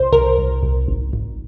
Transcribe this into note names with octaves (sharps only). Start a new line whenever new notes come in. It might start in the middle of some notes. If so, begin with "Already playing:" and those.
Already playing: C2 C5
C2 A#4
C2
C2
G#1
G#1